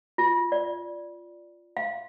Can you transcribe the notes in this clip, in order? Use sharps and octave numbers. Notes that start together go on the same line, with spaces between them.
F4
D5
F5